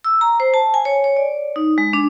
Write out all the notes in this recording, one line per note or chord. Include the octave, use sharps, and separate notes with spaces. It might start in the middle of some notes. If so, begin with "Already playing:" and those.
E6
A#5
C5
A5
G#5
C#5
C#5
D5
D#4
G#3
D4